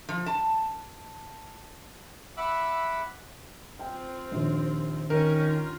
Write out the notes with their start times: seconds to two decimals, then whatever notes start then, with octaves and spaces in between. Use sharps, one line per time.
0.09 F3
0.26 A5
2.37 E5 F#5 B5 D6 E6 F#6
3.79 C4 F4 G5
4.31 A#1 D#2
5.10 D#3 C#4 A#4
5.46 F4